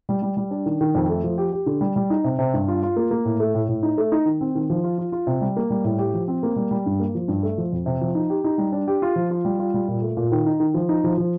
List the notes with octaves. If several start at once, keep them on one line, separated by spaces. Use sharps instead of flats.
G3
G3
G3
D4
D#3
D#3
F2
A3
F3
G4
G4
D3
G3
G3
D#4
C3
C3
G2
F4
F4
A#3
A#3
A2
A3
A2
A2
D#4
A3
D#4
D#3
C4
D#3
F3
F4
F4
F4
C3
G3
A#3
G3
A2
G4
F3
C4
A#3
G3
G3
G2
A#3
F3
G2
A3
F3
F2
C3
F3
D#4
G4
D#4
G3
D4
G4
F4
F3
F4
G3
F4
G3
A#2
A3
A#2
D#3
D#4
D#3
F3
D#4
F3
F3